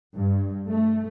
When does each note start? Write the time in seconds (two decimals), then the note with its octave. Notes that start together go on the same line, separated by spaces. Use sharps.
0.14 G2
0.69 A3